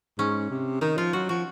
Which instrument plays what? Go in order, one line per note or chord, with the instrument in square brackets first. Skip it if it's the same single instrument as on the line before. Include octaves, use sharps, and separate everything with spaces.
[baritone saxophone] G#2 [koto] C#4
[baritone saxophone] C3
[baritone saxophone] D#3 [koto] D#4
[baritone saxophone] F3 [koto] F4
[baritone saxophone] F#3 [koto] F#4
[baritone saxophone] F3 [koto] F#4